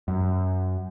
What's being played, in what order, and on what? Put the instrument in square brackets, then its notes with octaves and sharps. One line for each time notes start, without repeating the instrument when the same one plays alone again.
[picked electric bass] F#2